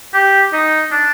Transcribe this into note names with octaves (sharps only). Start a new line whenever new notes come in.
G4
D#4
D4